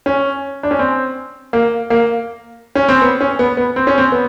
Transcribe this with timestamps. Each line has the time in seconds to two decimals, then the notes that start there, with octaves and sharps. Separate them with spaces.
0.06 C#4
0.63 D4
0.71 C#4
0.79 C4
1.53 A#3
1.90 A#3
2.75 C#4
2.89 C4
3.02 B3
3.20 C#4
3.39 B3
3.57 B3
3.76 C4
3.87 C#4
3.98 C4
4.12 B3